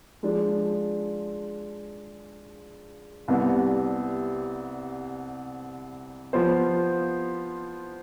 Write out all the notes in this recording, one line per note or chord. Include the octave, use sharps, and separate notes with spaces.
F3 G#3 D4
C2 C3 G3 B3
F3 B3 F4 C5